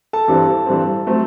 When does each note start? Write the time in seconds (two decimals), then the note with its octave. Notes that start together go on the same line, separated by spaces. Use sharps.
0.13 A4 A5
0.28 G2 E3 G3 C4
0.66 G2 E3 G3 C4
1.07 F#3 A3 C4